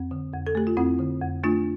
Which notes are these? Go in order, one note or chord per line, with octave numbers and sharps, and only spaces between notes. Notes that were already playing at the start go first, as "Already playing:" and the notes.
Already playing: F2 C4
D3
F2
A4
A3 G4
F4
F2 C4 E4
D3
F2
A3 D4 F4